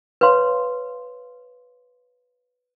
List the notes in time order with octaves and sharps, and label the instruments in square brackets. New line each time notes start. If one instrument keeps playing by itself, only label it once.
[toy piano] B4 C#5 F5 C6